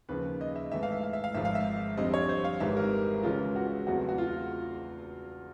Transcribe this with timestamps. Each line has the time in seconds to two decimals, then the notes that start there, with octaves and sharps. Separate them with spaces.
0.09 D#2 C#3 F3 B4
0.41 D#5
0.56 E5
0.72 G#2 E3 A3 E5
0.83 F5
0.92 E5
1.03 F5
1.13 E5
1.24 F5
1.35 G#1 G#2 F3 E5
1.45 F5
1.55 E5
1.97 F2 D3 G3 C4 D#5
2.14 C#5
2.29 C5
2.44 F5
2.60 G#1 G#2 E3 G3 E5
2.77 A#4
3.23 C#2 C#3 E3 G#3 C#4 F4
3.56 F#4
3.86 E2 C#3 F#3 A3 C4 F#4
4.09 F#4
4.18 F4